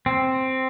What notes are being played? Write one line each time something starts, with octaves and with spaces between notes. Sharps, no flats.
C4